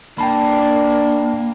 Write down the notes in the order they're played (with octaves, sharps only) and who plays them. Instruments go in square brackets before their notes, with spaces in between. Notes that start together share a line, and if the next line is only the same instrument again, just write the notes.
[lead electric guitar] A#3 [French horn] D4 [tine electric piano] G5 A5 B5